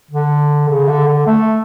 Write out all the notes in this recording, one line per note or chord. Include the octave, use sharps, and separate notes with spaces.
D3
C#3
D3
D3
A3